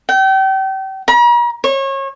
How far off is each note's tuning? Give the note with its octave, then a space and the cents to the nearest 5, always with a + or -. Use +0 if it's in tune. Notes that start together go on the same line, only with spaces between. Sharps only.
G5 -35
A#5 +45
C#5 -30